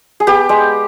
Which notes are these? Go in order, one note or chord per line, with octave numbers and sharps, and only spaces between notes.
G#4
B3 G4
G#3